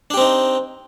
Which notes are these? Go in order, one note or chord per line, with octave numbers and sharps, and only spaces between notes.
C4 D4 D#4 G4